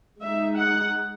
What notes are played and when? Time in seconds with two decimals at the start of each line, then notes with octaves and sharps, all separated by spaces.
0.21 G#3 D#4 E5
0.58 F#5